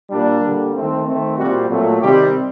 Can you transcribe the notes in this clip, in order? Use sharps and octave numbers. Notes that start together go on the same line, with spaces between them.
A#2 G3 A#3 D4
D3 G3 A#3
D#3 A3 C4
D#3 A3 C4
A#2 G3 C4 F#4
A#2 F#3 A3
C3 D#3 G3 C4 G4